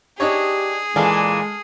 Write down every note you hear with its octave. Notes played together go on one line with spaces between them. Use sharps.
D4 D#4 G4 G#4 C#5
A#2 E3 G#3 A4 D5 F5